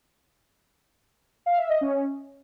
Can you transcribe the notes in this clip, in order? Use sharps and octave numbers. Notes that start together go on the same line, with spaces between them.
F5
E5
D#5
C#4